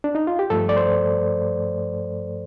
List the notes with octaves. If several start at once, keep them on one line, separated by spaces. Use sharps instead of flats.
D4
D#4
F4
G4
G2 F3 A3 A4
D5
C5